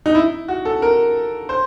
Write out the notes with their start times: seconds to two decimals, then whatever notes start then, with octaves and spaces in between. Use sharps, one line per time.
0.06 D#4
0.15 E4
0.48 F#4
0.65 A4
0.82 A#4
1.49 C5